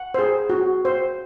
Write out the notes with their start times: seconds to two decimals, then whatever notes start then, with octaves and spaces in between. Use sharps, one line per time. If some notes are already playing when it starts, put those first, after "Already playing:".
Already playing: F#5
0.14 G#4 C5
0.50 F#4
0.85 C5